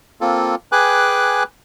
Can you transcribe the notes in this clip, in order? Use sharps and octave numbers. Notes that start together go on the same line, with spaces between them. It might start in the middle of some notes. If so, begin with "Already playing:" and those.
A#3 C4 F4 A4
G#4 B4 G5 G#5 D6 F#6